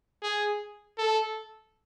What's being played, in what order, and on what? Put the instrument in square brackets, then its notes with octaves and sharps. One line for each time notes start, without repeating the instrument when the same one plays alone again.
[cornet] G#4
A4